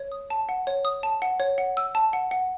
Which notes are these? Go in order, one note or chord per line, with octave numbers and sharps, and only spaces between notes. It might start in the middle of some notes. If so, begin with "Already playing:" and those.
Already playing: C#5
D#6
A5
F#5
C#5
D#6
A5
F#5
C#5
F#5
E6
A5
F#5
F#5